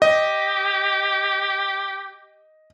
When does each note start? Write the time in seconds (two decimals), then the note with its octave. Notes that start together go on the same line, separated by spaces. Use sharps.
0.02 G4 D#5